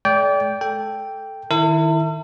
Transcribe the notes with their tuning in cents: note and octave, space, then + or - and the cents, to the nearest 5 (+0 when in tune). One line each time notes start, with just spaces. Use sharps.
G#3 +45 D5 -30 G5 +0
A4 +0 G5 +0
D#3 +0 E4 +0 A4 +45